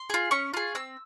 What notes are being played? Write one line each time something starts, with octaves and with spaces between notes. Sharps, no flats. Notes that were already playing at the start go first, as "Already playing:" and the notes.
Already playing: C6
F4 G#4
C#4 C#6
F4 G#4
C4 E6